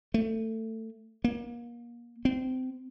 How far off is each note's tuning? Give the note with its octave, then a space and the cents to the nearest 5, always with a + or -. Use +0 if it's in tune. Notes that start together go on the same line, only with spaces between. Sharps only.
A3 +20
A#3 +30
C4 -25